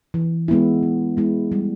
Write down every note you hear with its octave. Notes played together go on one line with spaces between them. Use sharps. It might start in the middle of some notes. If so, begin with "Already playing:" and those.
E3
G#3 B3 E4
E3
G#3 B3 E4
G3